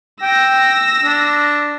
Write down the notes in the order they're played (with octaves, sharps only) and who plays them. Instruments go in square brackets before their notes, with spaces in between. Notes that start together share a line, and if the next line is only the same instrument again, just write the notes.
[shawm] G5 [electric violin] E6 A#6
[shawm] D4